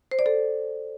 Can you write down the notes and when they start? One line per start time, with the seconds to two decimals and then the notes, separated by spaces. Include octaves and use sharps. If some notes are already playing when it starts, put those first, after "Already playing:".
0.11 C5
0.19 D5
0.26 A4